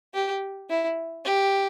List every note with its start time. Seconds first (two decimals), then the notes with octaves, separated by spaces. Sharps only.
0.14 G4
0.70 E4
1.25 G4